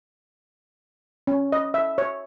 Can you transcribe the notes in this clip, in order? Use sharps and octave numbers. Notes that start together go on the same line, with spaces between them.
C#4
D#5
E5
C#5